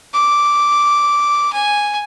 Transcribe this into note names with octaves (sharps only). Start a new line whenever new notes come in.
D6
G#5